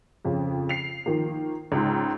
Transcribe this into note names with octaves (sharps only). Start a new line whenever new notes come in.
F2 C#3
C7 F7
D#3 F3 A#3
C#2 G#2